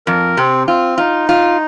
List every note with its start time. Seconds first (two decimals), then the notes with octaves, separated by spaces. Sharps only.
0.07 F2 A#4
0.37 C3 C4
0.67 C4 F4
0.98 D#4 F4
1.29 F4